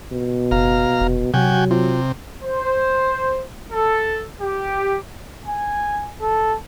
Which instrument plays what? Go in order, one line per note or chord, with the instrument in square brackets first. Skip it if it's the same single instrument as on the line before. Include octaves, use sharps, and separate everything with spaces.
[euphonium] B2
[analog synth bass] F#1 [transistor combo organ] F5 A#5
[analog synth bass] F1
[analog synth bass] C3 [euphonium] F#3 [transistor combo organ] F#4 G5 G#5
[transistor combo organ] C3 [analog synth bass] F4
[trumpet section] C5
A4
G4
[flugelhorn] G#5
A4